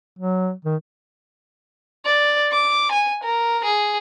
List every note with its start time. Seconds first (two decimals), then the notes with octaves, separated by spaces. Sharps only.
0.19 F#3
0.65 D#3
2.06 D5
2.52 D6
2.92 G#5
3.24 A#4
3.65 G#4